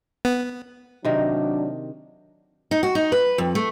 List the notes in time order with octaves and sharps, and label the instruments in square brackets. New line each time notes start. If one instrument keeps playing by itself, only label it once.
[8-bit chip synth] B3
[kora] C3 D#3 A#4 [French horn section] F#3 D4
[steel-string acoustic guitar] D#4
F#4
D#4
B4
F2
A3